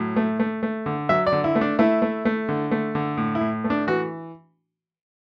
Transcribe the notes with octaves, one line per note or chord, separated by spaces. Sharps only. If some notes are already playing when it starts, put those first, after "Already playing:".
Already playing: A2 F#3
A3
A3
A3
D3
F#3 E5
D5
D3
E4
A3
D4
A3 E4
A3
A3
D3
A3
D3
A2
E4
A2
A3
D4
E3 F#4